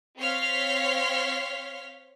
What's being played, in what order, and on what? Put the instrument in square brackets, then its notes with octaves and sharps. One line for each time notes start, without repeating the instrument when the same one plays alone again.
[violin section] C4 C#5 F5 C6 F6 B6